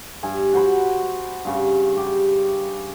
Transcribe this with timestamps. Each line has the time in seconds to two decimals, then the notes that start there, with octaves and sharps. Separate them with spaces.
0.23 G2 G#5
0.53 F#4 C5 B5
1.45 G2 C#3
1.97 G4